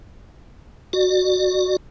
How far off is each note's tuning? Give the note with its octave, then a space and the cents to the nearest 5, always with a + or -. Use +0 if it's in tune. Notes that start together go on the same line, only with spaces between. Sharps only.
F#4 +0 D5 +35